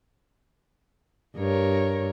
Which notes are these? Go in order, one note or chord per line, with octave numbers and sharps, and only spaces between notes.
G2 A#4 C#5